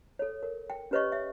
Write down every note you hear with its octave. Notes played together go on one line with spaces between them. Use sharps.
A4 C#5
A#4
G5
C#4 G4 B4 C#5 D#5 C#6
E5